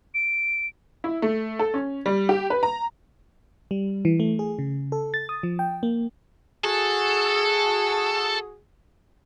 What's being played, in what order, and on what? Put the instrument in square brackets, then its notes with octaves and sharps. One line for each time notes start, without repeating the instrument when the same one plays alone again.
[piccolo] D7
[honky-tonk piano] E4
A3
A4
C#4
G3
G4
B4
A#5
[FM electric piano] G3
E3
A3
G#4
C#3
A4
A6
D#6
F3
G5
A#3
[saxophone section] F#4 G#4 [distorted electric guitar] A4